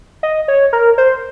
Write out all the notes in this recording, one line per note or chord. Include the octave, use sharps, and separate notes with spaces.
D#5
C#5
A#4
C5